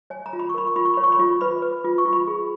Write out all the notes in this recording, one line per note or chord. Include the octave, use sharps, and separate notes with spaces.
C#5 G#5
A#5
F4
B5
C#6
A#4 B5
C#6
F4 B5
C#6
C#5 B5
C#6
B5
F4
B4 B5
B4
F4
C#6
F4
B5
G#4